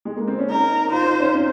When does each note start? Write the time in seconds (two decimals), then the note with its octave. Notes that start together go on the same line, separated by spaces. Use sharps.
0.05 G#3
0.17 A#3
0.28 C4
0.39 C#4
0.50 D#4 A#4
0.88 D#4
0.93 F4 C5
1.06 D#4
1.20 C#4
1.35 C4